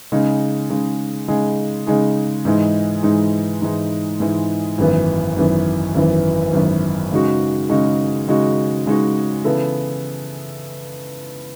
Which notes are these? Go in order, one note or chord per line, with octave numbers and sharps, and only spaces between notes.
C#3 G#3 D#4 G#4
C#3 G#3 D#4 G#4
C#3 G#3 D#4 G#4
C#3 G#3 D#4 G#4
G#2 E3 G#3 D#4
G#2 E3 G#3 D#4
G#2 E3 G#3 D#4
G#2 E3 G#3 D#4
G#1 F#2 E3 B3
G#1 F#2 E3 B3
G#1 F#2 E3 B3
G#1 F#2 E3 B3
C#3 G#3 D#4 F#4
C#3 G#3 D#4 F#4
C#3 G#3 D#4 F#4
C#3 G#3 D#4 F#4
C#3 E3 B3 E4 A4